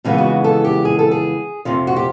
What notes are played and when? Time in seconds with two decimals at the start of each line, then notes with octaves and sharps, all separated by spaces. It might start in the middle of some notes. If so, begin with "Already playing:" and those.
0.05 F2 C#3 E3 G#3 B3
0.18 F#4
0.44 A4
0.64 G4
0.85 G#4
0.99 A4
1.11 G#4
1.65 F2 C3 F3
1.87 F#4
1.96 G4